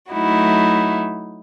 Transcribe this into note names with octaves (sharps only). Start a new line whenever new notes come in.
F#3 A3 D#4 E4 F#4